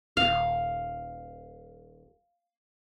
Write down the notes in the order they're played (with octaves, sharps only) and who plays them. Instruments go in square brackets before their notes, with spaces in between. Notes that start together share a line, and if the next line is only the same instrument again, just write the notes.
[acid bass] D#1 [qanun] F5